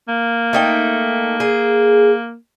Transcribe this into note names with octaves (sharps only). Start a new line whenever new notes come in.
A#3
A3 D#4 G5
G#4